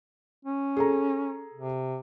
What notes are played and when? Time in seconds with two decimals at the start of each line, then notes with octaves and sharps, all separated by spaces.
0.45 C#4
0.77 G#4 A4 A#5
1.54 C3